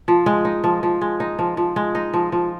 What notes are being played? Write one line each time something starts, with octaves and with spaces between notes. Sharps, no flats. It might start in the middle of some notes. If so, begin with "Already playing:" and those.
F3
G#3
D#4
F3
F3
G#3
D#4
F3
F3
G#3
D#4
F3
F3